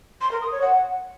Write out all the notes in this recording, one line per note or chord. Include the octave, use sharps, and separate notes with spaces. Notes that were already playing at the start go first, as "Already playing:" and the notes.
C6
A#4
D#6
C#5
F#5